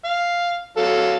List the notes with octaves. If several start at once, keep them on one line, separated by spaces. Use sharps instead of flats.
F5
F#3 A4 F5